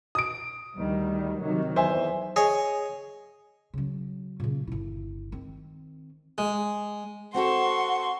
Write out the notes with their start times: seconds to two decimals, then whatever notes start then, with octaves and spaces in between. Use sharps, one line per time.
0.15 D#6 D7
0.76 D2 D#3 G3
1.41 C3 D#3 F#3
1.76 E2 C5 E5 G#5
2.36 G#4 C#5 D#5 G#5
3.74 C#3 F#3
4.40 A#2 C#3
4.67 G1 E4
5.32 D#3 C4
6.38 G#3
7.34 C4 F#4 A4 F#5 C6 C#6